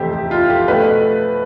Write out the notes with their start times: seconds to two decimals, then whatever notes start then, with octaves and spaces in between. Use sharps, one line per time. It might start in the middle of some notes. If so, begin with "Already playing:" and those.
Already playing: F2 C3 E3 A3 G4 C5 E5
0.13 G4
0.31 F4
0.50 G4
0.68 B2 A3 B4